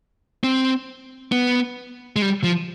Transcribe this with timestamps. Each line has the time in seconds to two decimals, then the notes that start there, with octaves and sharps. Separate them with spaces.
0.44 C4
1.32 B3
2.16 G#3
2.22 G3
2.44 F3